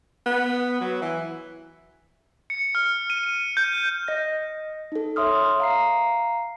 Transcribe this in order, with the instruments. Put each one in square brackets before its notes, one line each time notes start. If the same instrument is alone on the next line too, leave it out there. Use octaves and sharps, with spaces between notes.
[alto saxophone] B3
F#3
E3
[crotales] C#7
F6
D#7
G6
[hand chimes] D#5 A#6
D#4 A4
C#5 E5 C6 D#6 F6
F5 A#5 C7